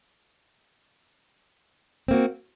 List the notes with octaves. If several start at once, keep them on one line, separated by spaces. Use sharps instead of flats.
A#3 C4 F#4